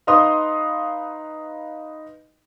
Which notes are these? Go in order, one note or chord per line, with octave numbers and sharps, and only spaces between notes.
D#4 B4 F5 C6 D#6